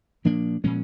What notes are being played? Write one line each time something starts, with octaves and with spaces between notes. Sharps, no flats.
A#2 F3 A#3 D4
A#2 F3 G#3 C#4